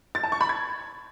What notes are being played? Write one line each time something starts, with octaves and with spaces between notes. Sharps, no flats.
A6
A5
C#6
B5
G#6